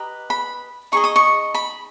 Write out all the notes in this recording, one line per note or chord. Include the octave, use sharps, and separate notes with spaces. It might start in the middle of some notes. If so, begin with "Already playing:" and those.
Already playing: G4 B4 D#5 A#5
B5
D#4 G#4 D#5 C#6
D#6
C#6
B5